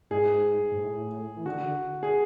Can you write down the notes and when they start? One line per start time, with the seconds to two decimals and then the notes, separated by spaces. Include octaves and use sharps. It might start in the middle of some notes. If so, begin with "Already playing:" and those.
0.10 G#2 G#4
0.72 G#2
0.78 A2
1.36 E3
1.45 D3 F#4
2.03 G#4